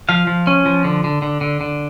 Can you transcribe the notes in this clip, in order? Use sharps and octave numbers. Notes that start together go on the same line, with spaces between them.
F3 F5
F3
C#4
F3
D3
D3
D3
D3
D3